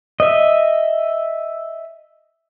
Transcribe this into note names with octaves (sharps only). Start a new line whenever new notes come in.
D#5 E5